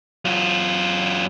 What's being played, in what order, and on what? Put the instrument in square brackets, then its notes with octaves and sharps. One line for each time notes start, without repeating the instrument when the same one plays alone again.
[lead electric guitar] F#2 F4